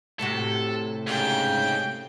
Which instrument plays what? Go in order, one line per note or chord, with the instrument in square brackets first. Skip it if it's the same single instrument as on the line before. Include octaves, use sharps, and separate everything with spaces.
[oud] A2 C3 F#4 [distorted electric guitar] A4
[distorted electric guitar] G#2 [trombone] C#3 [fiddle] G5